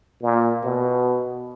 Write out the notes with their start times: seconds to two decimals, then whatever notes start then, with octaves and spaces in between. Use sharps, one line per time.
0.22 A#2
0.63 B2